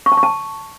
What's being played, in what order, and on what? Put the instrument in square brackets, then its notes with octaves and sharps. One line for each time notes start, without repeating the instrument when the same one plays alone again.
[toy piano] C#6
A5
C#6
A5